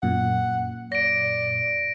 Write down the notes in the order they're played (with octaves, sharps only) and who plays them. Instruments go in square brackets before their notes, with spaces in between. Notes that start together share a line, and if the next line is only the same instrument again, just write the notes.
[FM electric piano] F#2 A#2 [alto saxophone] F#5
[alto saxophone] D5 [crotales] A#6 D7